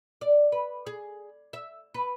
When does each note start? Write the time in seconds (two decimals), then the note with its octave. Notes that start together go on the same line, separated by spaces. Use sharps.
0.21 D5
0.52 B4
0.87 G#4
1.53 E5
1.94 B4